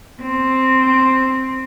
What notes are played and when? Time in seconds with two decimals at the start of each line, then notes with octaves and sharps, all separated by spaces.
0.22 C4